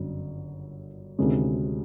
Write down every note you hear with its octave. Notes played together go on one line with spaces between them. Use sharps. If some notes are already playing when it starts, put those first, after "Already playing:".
Already playing: G1 F#2 D3
D2 C3 D#3 G#3 C#4